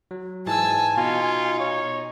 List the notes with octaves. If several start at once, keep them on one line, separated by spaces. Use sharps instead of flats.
F#3
G#2 E3 G#3 G#5 A5 E6
B2 D#4 F4 F#4
C#5